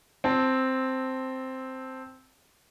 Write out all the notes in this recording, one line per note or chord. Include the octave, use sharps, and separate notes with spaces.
C4 A5